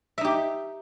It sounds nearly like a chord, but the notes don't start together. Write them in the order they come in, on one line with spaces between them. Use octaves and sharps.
E5 D#4 G4